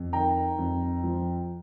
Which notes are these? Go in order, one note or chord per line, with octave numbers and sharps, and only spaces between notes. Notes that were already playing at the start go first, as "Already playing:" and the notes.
Already playing: F2
D#3 G5 A#5
F2
F3